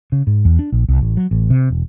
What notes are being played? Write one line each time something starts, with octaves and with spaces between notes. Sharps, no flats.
C#3
G#2
E2
D4
A#1
C2
A1
F#3
A1
C3
E1